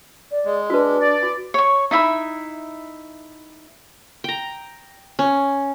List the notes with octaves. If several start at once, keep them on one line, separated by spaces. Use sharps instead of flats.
D5
G#3
D4 F#4 B4
D5
F#4
C#5 C#6
D#4 E4 E5 B5
G5 A#5
C#4